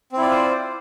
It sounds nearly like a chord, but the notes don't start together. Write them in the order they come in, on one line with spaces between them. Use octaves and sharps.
C4 E4 D5 F4 C5